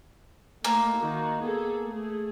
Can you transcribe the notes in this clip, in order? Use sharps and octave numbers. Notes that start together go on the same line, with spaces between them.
A3 A#3 D#4
D#3 F#4
B3 G#4 A4
A3 G#4